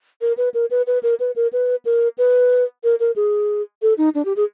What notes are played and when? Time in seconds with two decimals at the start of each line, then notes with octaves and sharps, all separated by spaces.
0.21 A#4
0.38 B4
0.54 A#4
0.71 B4
0.87 B4
1.03 A#4
1.20 B4
1.36 A#4
1.53 B4
1.85 A#4
2.18 B4
2.84 A#4
3.00 A#4
3.16 G#4
3.82 A4
3.98 D#4
4.15 D4
4.25 G4
4.36 G#4